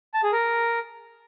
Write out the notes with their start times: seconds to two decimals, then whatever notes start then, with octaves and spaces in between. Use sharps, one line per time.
0.14 A5
0.23 G#4
0.32 A#4